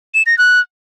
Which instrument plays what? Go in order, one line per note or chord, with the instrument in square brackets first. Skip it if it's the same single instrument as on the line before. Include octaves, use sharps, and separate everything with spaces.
[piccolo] E7
A#6
F#6